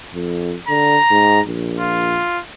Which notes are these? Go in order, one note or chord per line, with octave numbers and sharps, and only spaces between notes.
F2
D3 A#5
G#2
A#1
F4